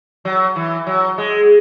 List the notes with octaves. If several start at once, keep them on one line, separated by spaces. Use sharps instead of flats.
F#3
E3
F#3
G#3